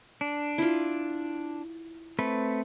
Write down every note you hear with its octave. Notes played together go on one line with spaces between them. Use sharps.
D4
E4 F4
A3 C4 B4